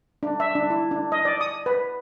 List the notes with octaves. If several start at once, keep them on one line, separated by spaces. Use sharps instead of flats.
D4
E5
D4
E4
D4
D#5
D5
D#6
B4